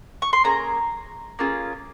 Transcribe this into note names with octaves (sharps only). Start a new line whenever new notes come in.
C#6
C6
A#3 C#4 G#4 A#5
A#3 C#4 F4 G#4